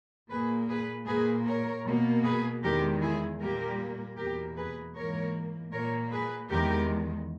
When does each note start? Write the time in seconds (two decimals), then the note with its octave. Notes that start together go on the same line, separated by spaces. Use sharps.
0.30 A#2 A#3 G#4 B4
0.69 G#4 B4
1.07 A#2 A#3 G#4 B4
1.46 A#4 C#5
1.86 B2 A#3
2.24 G#4 B4
2.62 E2 D#3 G#3 G4 A#4
3.01 E4 G#4
3.40 A#2 G3 A#3 G4 A#4
4.17 E2 B2 A#3 G4 A#4
4.56 G#4 B4
4.95 G#2 E3 A#3 A#4 C#5
5.72 A#2 A#3 A#4 C#5
6.12 G#4 B4
6.50 E2 D#3 G#3 G4 A#4